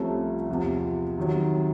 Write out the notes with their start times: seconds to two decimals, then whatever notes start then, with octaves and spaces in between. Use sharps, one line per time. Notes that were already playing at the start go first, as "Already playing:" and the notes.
Already playing: C2 C3 F3 A3 C#4
0.49 E2 C3 F3
1.18 C3 D#3 F#3